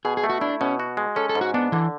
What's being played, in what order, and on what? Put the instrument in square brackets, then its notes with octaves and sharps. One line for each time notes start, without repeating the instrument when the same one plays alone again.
[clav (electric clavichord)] B2 [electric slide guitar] G#4
[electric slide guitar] G#4
[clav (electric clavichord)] A3
[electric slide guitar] F#4
[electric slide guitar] D4 [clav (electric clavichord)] E4
[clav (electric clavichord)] B2 [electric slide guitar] C#4
[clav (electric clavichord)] F#4
G#3
[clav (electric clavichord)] C#4 [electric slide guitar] A4
[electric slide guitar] A4
[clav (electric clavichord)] G#2
[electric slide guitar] F#4
[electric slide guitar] B3 [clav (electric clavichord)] D4
[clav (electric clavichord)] D3 [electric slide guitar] E3